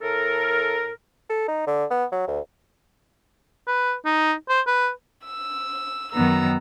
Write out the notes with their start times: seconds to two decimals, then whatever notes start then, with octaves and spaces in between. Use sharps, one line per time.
0.01 A2 A4 A#4
1.30 A4
1.48 D#4
1.67 D3
1.91 B3
2.12 F#3
2.28 D2
3.67 B4
4.05 D#4
4.49 C5
4.67 B4
5.26 E6
6.13 F#2 D#3 F#3 B3 A#5 E6